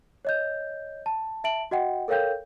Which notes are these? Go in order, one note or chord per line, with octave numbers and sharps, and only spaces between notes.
C#5 D#5 G6
A5
E5 A5 D7 F#7
F#4 D#5 F#5 G5
A4 A#4 C#5 F5 G5 G6